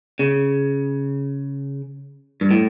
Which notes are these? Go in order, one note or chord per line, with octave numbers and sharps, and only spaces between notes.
C#3
G2
A2